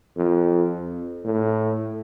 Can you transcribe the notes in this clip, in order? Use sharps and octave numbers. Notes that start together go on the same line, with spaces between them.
F2
A2